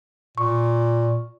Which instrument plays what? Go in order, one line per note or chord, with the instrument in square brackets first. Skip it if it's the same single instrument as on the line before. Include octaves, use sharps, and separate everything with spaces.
[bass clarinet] A#2 [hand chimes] C#6